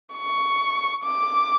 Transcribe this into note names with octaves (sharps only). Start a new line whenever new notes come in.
C#6
D6